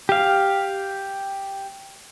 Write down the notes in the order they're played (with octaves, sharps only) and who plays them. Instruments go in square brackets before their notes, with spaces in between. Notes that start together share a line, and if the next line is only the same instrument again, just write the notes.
[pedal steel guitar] G4 F5